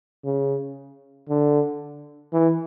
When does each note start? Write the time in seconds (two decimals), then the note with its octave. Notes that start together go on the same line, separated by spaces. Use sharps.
0.25 C#3
1.29 D3
2.33 E3